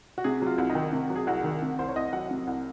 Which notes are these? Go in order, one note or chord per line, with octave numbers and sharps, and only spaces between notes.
F#4
C3 G#4
F#3 F4
C2
D#4
D#3
C3
F#3
G#4
C2 F#4
D#3
C3
C2 C5
C#5
C2 D#5
F#3 F#5
C3
C2